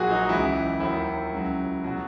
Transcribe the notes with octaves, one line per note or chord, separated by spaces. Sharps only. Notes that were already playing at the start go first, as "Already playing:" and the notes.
Already playing: A#1 A#2 F#3 F#4 G#4
D#4
C#2 C#3 E3 E4
D#2 D#3 F#3 E4
C#2 C#3 F#3
B2 F#3 F#4